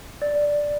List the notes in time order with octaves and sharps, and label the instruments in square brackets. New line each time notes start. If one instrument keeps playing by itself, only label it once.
[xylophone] D5